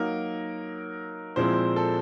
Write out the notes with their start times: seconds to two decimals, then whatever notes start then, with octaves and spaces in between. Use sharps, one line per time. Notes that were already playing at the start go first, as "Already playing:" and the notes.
Already playing: F#3 A#3 D#4 A#4
1.36 A#2 F3 G#3 C4 E4 C5
1.76 A4